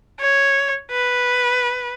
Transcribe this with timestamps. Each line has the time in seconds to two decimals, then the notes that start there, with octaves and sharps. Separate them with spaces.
0.20 C#5
0.91 B4